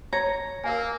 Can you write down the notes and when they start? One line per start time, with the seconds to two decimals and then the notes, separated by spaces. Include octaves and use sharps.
0.13 C#5 A#5
0.64 A#3 A#4 F5 G#5